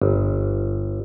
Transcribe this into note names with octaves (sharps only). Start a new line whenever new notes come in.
G1